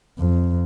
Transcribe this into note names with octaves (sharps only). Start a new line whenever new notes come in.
F2